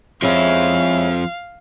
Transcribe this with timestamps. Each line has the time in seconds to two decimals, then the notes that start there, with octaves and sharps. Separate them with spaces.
0.22 F3 G#3 C4 C#4 E4 F5